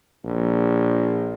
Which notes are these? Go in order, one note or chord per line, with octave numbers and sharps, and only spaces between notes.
A#1